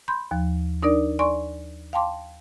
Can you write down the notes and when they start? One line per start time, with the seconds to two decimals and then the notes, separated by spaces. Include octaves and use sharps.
0.08 B5 C6 G6
0.31 D#2 F3
0.82 D4 D#4 A#4 D5
1.19 D5 G#5 C6 C#6
1.93 F5 G5 A5 C6 D6